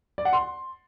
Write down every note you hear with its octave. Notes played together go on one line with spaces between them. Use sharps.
D5
F#5
C6